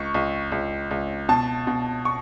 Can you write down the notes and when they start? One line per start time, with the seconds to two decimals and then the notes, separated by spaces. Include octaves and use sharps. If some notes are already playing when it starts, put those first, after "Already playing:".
Already playing: C#2 C#6
0.14 C#2
0.52 C#2
0.91 C#2
1.29 B2 A5
1.67 B2
2.05 C#6